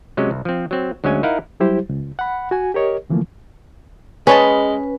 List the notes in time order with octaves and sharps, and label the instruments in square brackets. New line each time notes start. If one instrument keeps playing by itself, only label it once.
[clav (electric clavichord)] C3 F#3 G#3 C#4
C2
F3 C4
F#3 C4
D2 F#3 G#3 C#4 G#5
D#4 E4 A#4 F5 F#5
[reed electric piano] F#3 G3 E4 G4 C5
C#2
F#5 B5
F#4 G#5
G4 A#4 C#5 D#5
D3 E3 F3 A3 A#3
[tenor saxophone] G#3 [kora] C#4 [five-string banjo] G#4 C#5 A5 [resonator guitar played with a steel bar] B4